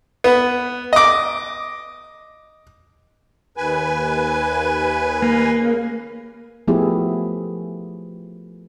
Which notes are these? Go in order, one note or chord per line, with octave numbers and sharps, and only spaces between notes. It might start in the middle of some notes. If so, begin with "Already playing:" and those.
B3
D#5 D6
D#2 B4 G#5
A#3
C#3
F3 A3 B3 E4 G4 G#4